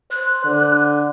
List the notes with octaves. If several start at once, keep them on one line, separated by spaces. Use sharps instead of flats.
C5 F#6
D3